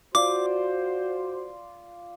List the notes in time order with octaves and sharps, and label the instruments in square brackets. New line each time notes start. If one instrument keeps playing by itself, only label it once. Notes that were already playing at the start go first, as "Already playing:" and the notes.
[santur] F4 D5 [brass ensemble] F#4 C5 [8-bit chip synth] D6